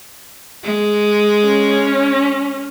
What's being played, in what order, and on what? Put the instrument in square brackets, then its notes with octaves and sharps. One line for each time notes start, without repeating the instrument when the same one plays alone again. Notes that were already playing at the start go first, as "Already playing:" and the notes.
[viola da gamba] G#3
[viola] C#4